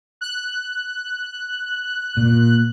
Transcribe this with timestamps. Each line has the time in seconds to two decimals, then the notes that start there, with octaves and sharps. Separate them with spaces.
0.21 F#6
2.17 A#2